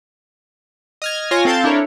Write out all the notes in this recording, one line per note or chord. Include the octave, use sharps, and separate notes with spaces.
D#5 F6 G#6
F4 C#5 G#5 A#6
C4 A4 F5 A5 G6 A6
D4 E4 A4 A#4 C#5